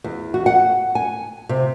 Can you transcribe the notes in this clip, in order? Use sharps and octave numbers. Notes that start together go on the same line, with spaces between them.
E2
F#4
F#5
G#5
C3